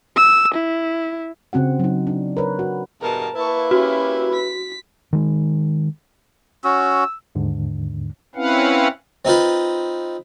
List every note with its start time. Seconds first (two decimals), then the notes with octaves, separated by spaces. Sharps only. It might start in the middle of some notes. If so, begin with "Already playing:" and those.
0.16 E6
0.54 E4
1.53 C#3 C4 F#4 F#5
1.79 F#3 D#4
2.07 D4
2.37 A#4 B4 C#5
2.59 F#4
3.01 E2 G2 B2 A#4 A5
3.36 A#3 E4 B4 A5 C#6
3.71 C#4 F#4 G4
4.34 B6
5.13 D#3 G#3
6.64 C#4 F#4 E6
7.35 D#2 G#2 D3
8.35 C4 C#4 E4 B4 F5 F#5
9.25 C4 D#4 F4 B4